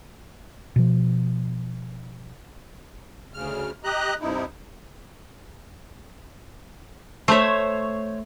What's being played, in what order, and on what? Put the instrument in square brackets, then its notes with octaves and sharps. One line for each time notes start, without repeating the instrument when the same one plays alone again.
[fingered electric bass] B2 F3
[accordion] D2 C#3 F6
G4 D#5 A#5 F#6
G2 C3 D#4 E4
[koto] A3 E5 [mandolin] C5 C#5